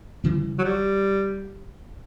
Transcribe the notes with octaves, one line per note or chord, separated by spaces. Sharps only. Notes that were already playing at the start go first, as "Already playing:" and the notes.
C#3 E3 G3
F#3
G3